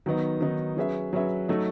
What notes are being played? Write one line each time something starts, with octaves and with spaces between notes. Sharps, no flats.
D#3 F#3 B3 D#4
D#3 F#3 B3 D#4
F#3 C#4 G#4 B4 E5
F#3 C#4 G#4 B4 E5
F#3 A3 D#4